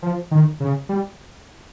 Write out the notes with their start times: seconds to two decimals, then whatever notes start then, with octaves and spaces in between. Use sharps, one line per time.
0.02 F3
0.31 D#3
0.60 C#3
0.89 G3